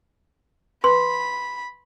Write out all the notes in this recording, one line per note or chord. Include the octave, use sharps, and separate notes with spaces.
B4 B5 C6